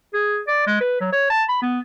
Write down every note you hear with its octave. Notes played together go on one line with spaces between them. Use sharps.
G#4
D5
G#3
B4
F#3
C#5
A5
B5
B3